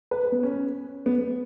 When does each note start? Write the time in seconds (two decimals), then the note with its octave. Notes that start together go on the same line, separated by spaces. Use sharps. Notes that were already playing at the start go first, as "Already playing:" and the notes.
0.11 B4
0.32 B3
0.43 C#4
1.06 B3